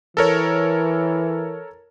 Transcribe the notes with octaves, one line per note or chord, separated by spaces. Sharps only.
E3 A4 A#4 C#5